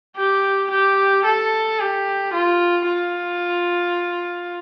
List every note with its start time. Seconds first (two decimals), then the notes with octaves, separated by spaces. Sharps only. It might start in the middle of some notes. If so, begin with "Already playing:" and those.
0.17 G4
0.71 G4
1.25 A4
1.80 G4
2.33 F4
2.88 F4